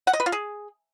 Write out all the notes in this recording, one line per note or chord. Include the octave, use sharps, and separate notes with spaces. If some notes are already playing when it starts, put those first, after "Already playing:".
F#5
D#5
B4
F4
G#4